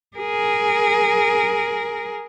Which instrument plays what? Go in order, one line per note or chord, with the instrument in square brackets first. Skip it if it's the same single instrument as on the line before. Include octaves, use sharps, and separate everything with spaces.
[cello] G#4 A#4